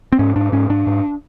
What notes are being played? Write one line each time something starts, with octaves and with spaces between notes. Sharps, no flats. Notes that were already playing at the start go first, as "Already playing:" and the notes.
C4
G#2 C#4
G#2 D4
G#2 C#4
G#2 D4
G#2